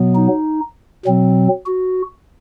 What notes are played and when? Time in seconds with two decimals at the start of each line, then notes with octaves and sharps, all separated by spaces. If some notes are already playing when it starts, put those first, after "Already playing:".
Already playing: B2 F#3 B3
0.15 D#4
1.05 B2 F#3 C4
1.66 F#4